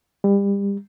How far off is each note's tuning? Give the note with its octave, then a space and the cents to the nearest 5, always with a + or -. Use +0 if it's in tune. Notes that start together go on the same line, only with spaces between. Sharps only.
G3 +30